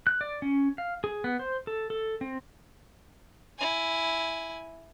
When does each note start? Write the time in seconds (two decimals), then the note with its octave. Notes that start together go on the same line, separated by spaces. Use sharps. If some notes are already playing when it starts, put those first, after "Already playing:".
0.07 F#6
0.21 D5
0.42 C#4
0.78 F5
1.04 G#4
1.24 B3
1.39 C5
1.67 A4
1.90 A4
2.21 C4
3.58 E4 G#5